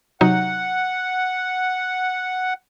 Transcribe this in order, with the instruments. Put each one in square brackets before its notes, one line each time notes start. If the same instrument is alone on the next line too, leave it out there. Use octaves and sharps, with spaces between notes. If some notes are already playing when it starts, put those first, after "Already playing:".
[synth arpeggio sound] C3 F#3 D#4 [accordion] F#5